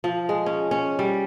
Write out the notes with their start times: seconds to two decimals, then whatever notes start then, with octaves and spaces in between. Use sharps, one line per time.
0.04 F3
0.29 G#3
0.46 C#4
0.71 C#4
0.99 G3